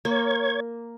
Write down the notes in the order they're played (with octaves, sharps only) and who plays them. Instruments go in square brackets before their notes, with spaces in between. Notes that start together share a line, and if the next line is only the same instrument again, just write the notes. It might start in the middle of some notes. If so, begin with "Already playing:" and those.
[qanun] A#3 [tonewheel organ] C#5 G#6